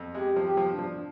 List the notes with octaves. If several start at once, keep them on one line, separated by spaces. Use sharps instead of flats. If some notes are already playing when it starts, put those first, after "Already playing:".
Already playing: F2
G#3 G4
F3
G4
F3
D4
F3